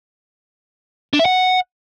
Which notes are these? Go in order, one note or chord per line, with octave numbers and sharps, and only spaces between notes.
D4
E5
F#5